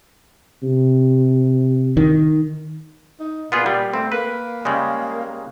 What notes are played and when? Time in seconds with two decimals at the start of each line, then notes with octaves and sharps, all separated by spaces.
0.63 C3
1.97 D#3
3.20 D#4
3.52 A#2 B3 F4 G#4
3.66 G3
3.94 A3 C4
4.12 A#3 B4
4.65 C#3 G3 G#3